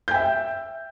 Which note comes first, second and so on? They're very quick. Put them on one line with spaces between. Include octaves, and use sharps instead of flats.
G6 G5 E5